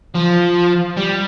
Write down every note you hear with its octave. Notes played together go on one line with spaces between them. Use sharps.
F3
G3